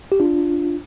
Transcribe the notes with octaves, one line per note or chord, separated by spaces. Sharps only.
G4
D4 F4